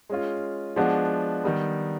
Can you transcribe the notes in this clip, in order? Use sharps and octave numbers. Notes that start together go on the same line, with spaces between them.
G#3 C#4 F4
F3 G#3 B3 D4 F#4
D#3 G3 B3